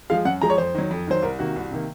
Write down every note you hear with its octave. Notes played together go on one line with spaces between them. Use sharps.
F3 G#3 F5
F#2 F#5
F3 G#3 A#5
C#5
F2 C5
D#3 F#3
F2
D#3 F#3 C5
C2 A#4
C3 D#3 A#3 F#4
C2
C3 D#3 A#3